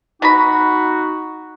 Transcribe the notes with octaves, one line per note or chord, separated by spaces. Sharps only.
B2 D#4 F#4 A#5 B5